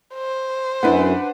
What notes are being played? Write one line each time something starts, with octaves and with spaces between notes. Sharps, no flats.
C5
F#2 B3 D4 E4 B4 F#5